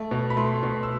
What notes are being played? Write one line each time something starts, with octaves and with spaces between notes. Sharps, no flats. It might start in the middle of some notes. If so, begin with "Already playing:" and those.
Already playing: A3
B2
B5
A3 C6
B2 C6
E6